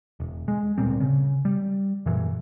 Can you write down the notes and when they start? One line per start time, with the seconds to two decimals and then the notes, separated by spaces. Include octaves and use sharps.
0.20 E1
0.48 G#3
0.78 D1 A#2 G3 C4
1.00 C#3
1.45 G3
2.06 F#2 A#2 E3